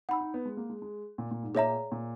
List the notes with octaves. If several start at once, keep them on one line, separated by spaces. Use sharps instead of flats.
D#4 F#5 B5 E6
D#4
B3
G#3
A#3
G#3
G#3
A#2
A#2
G#2
A#2 G#4 C#5 E5 A#5
A#2